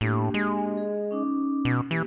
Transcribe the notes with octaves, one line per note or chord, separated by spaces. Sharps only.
A2 A#3 D4 G4
G#3
G#4
C#4 D#4 D6
B2
E3 A#3 G4